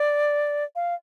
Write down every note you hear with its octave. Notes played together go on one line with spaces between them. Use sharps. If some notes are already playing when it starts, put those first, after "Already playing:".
Already playing: D5
F5